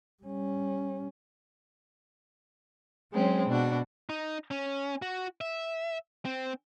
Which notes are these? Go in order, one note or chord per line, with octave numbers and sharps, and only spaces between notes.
G3 C#4
F#3 G#3 C4 C#4
B2 D4 F#4
D#4
C#4
F#4
E5
C4